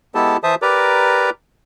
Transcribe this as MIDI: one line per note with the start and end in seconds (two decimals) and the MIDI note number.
0.15 0.37 56
0.15 0.37 59
0.15 0.37 64
0.15 0.37 67
0.15 0.37 69
0.15 0.37 81
0.43 0.55 52
0.43 0.55 72
0.43 0.55 76
0.43 0.55 81
0.43 0.55 87
0.62 1.30 67
0.62 1.30 70
0.62 1.30 71
0.62 1.30 74
0.62 1.30 82
0.62 1.30 86